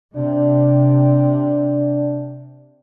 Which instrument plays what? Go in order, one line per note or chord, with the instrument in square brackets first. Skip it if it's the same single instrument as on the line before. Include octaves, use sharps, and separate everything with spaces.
[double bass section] C3 [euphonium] D4